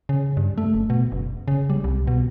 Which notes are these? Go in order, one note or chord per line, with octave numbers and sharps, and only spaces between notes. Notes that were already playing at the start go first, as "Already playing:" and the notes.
C#3
G2
A3
F#1
B2
F#1
C#3
G3
C2
B2